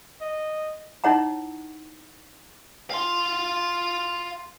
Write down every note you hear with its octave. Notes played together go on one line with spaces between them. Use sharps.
D#5
D#4 E4 C#5 F#5 A#5
F5 C6